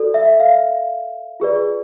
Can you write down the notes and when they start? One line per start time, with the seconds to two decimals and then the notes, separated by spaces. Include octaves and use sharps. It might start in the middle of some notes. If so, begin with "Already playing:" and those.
Already playing: F#4 A4 D5
0.14 E5
0.40 F5
1.40 F4 G#4 B4 D5